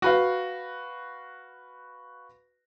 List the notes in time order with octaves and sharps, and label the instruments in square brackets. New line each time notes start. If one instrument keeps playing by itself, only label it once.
[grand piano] F#4 B4 F5